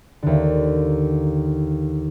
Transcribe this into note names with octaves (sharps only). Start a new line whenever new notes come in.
D#2 D3